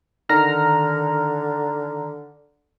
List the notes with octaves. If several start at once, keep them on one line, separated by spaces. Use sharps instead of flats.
D3 D#3 A#5 F6